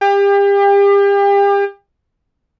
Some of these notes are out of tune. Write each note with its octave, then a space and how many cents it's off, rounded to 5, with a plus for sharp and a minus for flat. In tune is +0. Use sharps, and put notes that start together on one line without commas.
G4 +35